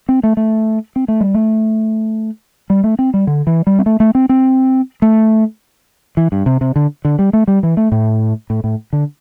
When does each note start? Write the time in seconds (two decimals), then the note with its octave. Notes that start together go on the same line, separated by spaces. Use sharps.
0.09 C4
0.23 A3
0.37 A3
0.96 C4
1.08 A3
1.21 G3
1.34 A3
2.70 G3
2.84 A3
2.99 C4
3.14 G3
3.27 D3
3.47 E3
3.67 G3
3.79 C4
3.86 A3
4.00 A3
4.15 C4
4.29 C4
5.02 A3
6.17 E3
6.32 G2
6.46 C3
6.61 C3
6.76 D3
7.05 D3
7.19 G3
7.33 A3
7.48 G3
7.63 E3
7.77 A3
7.92 A2
8.50 A2
8.64 A2
8.93 D3